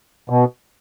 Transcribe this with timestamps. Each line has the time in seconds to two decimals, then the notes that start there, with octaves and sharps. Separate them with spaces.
0.30 B2